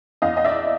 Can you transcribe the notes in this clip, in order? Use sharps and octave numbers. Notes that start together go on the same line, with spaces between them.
E2 D#5 F5
D#5
D5 E5